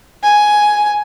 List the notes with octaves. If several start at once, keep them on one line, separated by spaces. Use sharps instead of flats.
G#5